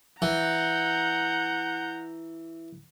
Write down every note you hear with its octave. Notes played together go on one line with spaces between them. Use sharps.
E3 F#5 A#5 G6